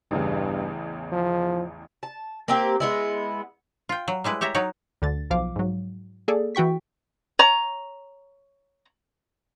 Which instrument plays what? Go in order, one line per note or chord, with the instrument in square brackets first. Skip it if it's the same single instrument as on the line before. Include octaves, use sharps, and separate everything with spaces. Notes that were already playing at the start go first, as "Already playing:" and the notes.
[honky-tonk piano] A1 E2 C#3 [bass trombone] G2
[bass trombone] F3
[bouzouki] A5
A#3 C4 G4
G#3 B3 E4
[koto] F4 G5
F#3
G3 G#3 E4 B4
G4 C#5 E5 A#5
F#3 D#4 F#4 C#5
[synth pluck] D2 D3 A6
B1 F3 F5 D6
G#2 F#3
A#3 G#4 A4 D5
E3 F#4 G5 C#6 B6
[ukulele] C#5 A#5